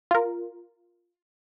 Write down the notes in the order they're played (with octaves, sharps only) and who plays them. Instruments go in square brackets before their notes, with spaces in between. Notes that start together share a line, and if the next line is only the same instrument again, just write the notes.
[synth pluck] F4 A#4